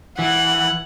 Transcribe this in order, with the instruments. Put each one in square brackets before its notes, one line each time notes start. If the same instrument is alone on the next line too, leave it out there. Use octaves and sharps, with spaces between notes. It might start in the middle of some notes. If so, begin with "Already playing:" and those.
[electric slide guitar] E3 [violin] F#5